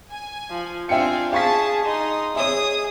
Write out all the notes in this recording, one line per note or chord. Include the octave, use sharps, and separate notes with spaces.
G#5
F3
C4 D4 F4 E5 G5 G#5 C#7
G#4 F5 A5 C#6 B6
D#4 C6 D#6
G#4 C#5 E5 D#6